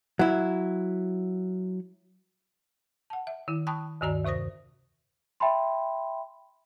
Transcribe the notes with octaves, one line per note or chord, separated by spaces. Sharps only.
F#3 E4
F#5 A5
E5
D#3 E4
G5 A5 B5 C#6 D#6 F#6
D2 G2 D#3 F#4 D5 A#5
D#2 C3 C5 D#6 A#6
E5 G5 A5 B5 C6